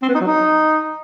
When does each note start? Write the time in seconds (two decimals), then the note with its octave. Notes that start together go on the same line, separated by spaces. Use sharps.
0.02 C4
0.09 B3
0.15 D#4
0.21 F#3
0.27 D#4